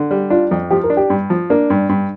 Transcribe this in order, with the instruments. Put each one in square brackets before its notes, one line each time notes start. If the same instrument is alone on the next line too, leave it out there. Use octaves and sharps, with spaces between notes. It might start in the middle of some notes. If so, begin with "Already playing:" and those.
Already playing: [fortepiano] D3
G3
[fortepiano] D4 [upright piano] F4
[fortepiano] F2
[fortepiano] F3 [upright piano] G4
[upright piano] A#4
[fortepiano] D4
[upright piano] G4
[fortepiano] G2
F3
[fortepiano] A#3 [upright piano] D4
[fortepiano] G2
G2